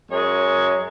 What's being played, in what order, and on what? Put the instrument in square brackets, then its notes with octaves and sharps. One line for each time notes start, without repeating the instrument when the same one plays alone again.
[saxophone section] F#2 G#3 G#4 C#5